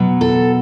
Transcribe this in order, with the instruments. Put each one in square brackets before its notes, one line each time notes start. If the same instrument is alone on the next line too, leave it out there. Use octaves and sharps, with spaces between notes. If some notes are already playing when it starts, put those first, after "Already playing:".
Already playing: [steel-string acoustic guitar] B2 F#3
A4